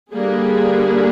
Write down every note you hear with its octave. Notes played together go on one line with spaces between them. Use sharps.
D3 G3 A#3 D4 G#4